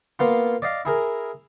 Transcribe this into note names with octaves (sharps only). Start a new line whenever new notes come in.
A#3 B3 F4
D5 D#5 F5
E4 G#4 A#4